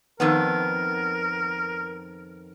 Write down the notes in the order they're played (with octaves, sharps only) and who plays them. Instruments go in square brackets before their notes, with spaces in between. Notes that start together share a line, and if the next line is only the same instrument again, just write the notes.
[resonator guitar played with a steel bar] F2 D#3 B3 [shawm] A#4